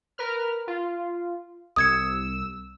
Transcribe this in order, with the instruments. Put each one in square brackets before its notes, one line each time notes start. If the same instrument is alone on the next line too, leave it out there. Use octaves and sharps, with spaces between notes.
[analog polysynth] A#4 B4 F6
F4
[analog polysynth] C2 E6 [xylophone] D#6 G#6 C#7